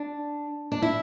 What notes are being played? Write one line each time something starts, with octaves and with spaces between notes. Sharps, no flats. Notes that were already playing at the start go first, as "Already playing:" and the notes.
Already playing: D4
D4
E4